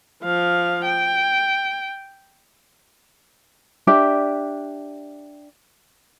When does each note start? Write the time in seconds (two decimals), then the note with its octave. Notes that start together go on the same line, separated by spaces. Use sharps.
0.24 F3 F5
0.85 G5
3.87 D4 G4 D5 E5